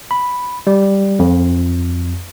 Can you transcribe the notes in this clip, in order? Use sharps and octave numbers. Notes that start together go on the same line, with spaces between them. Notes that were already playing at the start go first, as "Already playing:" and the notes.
B5
G3
F2